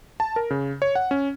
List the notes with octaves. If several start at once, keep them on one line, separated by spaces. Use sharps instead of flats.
A5
A#4
C#3
C#5
F#5
C#4